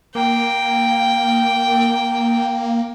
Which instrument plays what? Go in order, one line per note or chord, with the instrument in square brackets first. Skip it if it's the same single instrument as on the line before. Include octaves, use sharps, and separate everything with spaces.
[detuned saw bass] A#3 [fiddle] G5